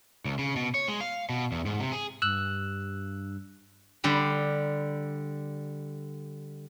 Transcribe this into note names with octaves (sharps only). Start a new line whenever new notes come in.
C#2
C#3
B2
C#5
G#3
F5
B2
E2
G#2
C3
G#4
G2 E6 F#6
D3 G3 B5